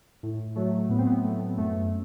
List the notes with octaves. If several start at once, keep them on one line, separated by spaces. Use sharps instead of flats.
A2
F#3 A3
A2 B3
C4
B3
A3
F#2 A3